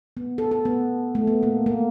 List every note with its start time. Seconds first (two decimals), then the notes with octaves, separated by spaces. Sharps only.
0.17 B3
0.38 A4
0.51 A4
0.65 B3
1.15 A3
1.27 B3
1.43 A#3
1.66 A#3